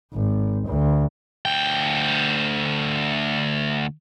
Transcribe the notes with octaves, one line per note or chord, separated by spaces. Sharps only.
G#1
D2
D2 G5